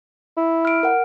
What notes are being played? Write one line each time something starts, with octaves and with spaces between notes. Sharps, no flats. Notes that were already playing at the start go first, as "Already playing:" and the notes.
E4
F6 D7
A#4 F#5